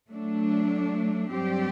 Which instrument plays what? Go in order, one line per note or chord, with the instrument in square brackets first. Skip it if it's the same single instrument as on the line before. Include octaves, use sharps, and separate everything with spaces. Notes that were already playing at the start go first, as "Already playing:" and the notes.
[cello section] F#3 A3 D4
G2 F#3 C4 G4 D5